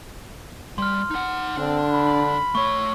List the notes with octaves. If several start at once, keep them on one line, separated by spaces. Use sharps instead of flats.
G3 C6 F6
D#4 F#5
D3 C4 D4
B5
A3 C#5 C#6